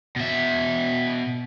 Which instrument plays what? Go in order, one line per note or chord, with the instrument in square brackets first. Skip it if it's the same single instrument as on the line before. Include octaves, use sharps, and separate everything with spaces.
[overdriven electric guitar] B2 E5